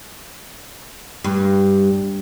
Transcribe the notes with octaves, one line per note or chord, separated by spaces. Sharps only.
G2